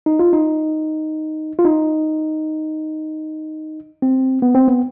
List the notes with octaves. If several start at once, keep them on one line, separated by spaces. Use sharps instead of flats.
D#4
F4
D#4
F4
D#4
C4
B3
C4
B3